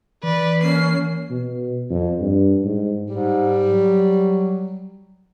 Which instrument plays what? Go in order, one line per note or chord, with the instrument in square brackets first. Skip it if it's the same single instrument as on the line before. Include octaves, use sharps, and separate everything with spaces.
[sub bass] E3 [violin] B4 [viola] D5
[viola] A#3 [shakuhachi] C#4 [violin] C7
[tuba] B2
F2
G2
G#2
[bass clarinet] G#2 [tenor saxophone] G3
[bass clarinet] F#3